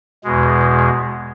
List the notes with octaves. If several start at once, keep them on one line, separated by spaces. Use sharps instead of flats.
E2 B2 G#3